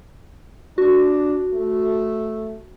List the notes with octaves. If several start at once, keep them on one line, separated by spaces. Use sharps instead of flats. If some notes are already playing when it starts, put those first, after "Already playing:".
D4 F#4
A3